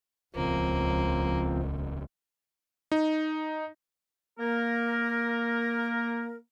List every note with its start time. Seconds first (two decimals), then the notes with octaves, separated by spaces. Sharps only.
0.36 D#1 C#2 C#3 F3 A#3 C4
2.92 D#4
4.38 A#3 A#4